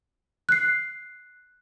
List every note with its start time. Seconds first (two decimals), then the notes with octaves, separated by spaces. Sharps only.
0.49 F#6 C7